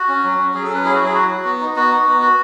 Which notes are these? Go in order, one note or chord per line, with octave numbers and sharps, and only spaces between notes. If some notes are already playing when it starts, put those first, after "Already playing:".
Already playing: F#4
C#4
F#3
C#4
F#3 G#4
A4
C#4
B4
E4 G#4
F#4
F#3 G#4
F#4
F#4
B3
D#4
B3 F#4
D#4
B3
F#4